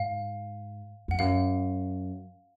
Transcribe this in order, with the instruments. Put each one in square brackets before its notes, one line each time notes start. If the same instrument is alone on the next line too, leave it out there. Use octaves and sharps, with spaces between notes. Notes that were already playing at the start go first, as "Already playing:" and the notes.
Already playing: [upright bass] G#2 [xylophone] F5
[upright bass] F2 [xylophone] F#5
[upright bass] F#2 [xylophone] F5